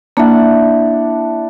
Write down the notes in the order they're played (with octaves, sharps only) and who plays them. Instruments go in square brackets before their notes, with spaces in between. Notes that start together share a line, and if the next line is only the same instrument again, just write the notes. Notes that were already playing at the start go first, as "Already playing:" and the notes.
[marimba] A#3 [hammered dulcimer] D4 E4 F#5